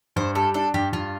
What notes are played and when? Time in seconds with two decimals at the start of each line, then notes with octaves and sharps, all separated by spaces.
0.16 G2 C5
0.35 G3 A4
0.54 D4 A4
0.74 G2 G4
0.93 G2 F4